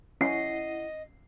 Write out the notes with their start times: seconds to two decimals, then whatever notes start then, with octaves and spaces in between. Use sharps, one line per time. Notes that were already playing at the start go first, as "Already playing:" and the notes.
0.21 C#4 E4 D#5 F#5 C7